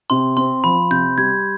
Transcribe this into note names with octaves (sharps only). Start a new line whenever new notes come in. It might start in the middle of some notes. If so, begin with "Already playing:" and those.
C3 C6
C4 C6
F3 B5
C3 G6
G3 G#6